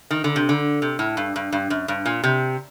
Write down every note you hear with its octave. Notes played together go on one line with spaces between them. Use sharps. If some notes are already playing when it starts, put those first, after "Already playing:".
D#3
D3
C3
D3
C3
A2
G2
G2
G2
F#2
G2
A#2
C3